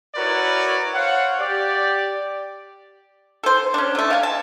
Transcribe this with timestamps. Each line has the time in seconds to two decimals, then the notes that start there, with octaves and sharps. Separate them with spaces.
0.15 E4 F#4 A#4 B4 C#5 D5
0.94 C5 C#5 F5 F#5
1.38 G4 D5
3.43 A4 C5
3.74 C#4 D4
3.95 D3 A3
4.10 F5 G#5
4.23 A5